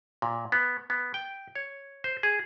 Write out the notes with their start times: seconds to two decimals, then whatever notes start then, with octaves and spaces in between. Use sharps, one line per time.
0.22 A#2
0.52 B3
0.90 B3
1.14 G5
1.55 C#5
2.04 C5
2.23 G#4